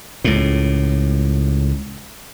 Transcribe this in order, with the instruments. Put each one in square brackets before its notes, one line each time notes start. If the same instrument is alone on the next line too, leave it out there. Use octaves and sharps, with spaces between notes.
[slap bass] C#2 A2